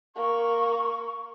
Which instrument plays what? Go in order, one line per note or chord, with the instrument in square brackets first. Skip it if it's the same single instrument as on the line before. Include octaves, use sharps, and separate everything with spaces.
[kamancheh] A#3 [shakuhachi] C#6